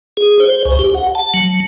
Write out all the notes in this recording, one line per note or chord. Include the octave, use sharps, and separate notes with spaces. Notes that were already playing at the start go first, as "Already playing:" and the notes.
G#4
C5
C#2
G4
F#5
A5
F#3